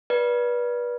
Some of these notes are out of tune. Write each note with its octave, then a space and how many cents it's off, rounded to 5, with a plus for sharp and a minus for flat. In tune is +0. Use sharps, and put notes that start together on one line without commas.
B4 -30 D5 +0